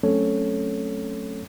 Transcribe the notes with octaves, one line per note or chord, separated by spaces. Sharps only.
F#3 A3 C4 C#4 A4 C#5